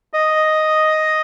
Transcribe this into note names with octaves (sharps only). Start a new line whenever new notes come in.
D#5